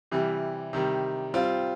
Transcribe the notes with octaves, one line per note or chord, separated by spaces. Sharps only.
C3 E3 G3
C3 D#3 G3
G3 C4 F4